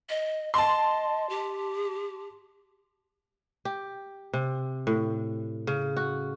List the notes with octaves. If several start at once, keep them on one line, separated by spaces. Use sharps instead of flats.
D#5
D#5 A5 C6
G4
G4
C3
A2
C#3
F#4